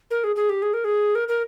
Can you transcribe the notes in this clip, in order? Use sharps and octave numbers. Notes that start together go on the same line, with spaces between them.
A#4
G#4
G#4
G4
G#4
A#4
G#4
A#4
A#4